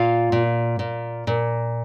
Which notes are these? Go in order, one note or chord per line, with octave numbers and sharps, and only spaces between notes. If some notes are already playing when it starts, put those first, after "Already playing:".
Already playing: A#2 F4 F5
A#2
A#2
A#2